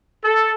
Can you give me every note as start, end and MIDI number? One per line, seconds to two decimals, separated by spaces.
0.24 0.54 69